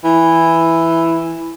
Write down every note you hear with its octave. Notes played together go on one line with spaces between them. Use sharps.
E3